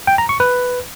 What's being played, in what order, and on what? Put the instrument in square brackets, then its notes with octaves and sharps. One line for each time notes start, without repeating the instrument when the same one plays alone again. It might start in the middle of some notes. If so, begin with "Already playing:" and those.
[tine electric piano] G5
A#5
C#6
B4